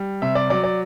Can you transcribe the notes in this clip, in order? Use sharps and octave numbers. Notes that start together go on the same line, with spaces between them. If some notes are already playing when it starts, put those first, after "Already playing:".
Already playing: G3
C3 E5
D5
F#3 D5
D5